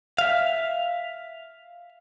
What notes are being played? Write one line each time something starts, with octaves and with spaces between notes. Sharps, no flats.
E5 F5